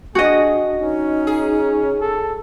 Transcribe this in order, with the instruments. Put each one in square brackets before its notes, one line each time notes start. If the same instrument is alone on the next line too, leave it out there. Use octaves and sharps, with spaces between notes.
[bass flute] D4 [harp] F#4 D#5 [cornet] G#4
[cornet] C#4 [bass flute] D#4
[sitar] G#4
[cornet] A4